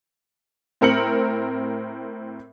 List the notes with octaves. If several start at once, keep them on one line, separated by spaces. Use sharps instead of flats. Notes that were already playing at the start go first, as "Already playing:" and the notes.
A2 C4 A#4 C#7 F#7